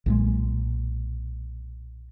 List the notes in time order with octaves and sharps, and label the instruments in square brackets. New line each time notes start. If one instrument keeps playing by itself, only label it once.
[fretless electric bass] B1 A#2 G#3